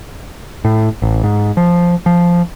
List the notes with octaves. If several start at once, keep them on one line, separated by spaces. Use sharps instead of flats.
A2
A1
G#2
F3
F3